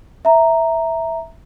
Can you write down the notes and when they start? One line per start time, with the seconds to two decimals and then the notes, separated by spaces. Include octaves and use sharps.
0.25 E5 A#5